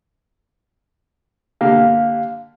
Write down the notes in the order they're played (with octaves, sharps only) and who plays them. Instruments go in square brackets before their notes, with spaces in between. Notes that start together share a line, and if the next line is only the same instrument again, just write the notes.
[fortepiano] D3 A#3 G4 [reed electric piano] F5